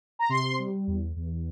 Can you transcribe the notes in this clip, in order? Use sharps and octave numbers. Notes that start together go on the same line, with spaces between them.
A#5
C3 C6
G3
E2
E2